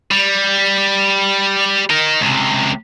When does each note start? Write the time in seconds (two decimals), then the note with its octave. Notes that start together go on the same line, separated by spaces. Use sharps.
0.11 G3
1.90 D#4 A#4
2.21 C#2 C3